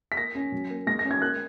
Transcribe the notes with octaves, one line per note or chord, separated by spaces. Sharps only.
B6
A#3 A#6
C#4
F#3
A#3
G#3 A#6
C#4 A#6
G#6
A#3 F#6